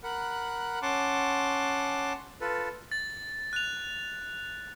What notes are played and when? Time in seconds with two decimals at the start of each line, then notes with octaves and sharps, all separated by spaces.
0.03 A#4 F#5 B5 F#6
0.82 C#4 F#5 A5 C6 D6
2.41 F4 A4 B4
2.92 A6
3.53 F#6 F7